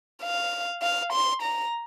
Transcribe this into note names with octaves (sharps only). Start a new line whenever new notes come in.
F5
F5
C6
A#5